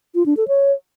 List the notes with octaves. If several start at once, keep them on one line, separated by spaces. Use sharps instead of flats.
F4
D4
A4
C#5